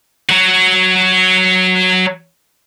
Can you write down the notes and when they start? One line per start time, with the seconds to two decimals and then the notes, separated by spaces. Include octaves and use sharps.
0.29 F#3 F#4